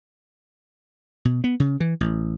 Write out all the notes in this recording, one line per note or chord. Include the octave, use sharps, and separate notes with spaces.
B2
B3
C#3
E3
A1